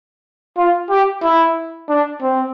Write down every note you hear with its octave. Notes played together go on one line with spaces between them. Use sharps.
F4
G4
E4
D4
C4